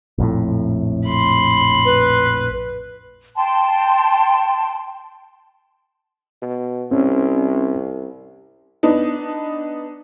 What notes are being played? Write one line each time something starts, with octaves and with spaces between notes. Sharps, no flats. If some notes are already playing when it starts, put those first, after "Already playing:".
A#1 F2 A2
B5 C6
B4
G5 A5 C6
B2
C2 C4 C#4
B3 D4 D#4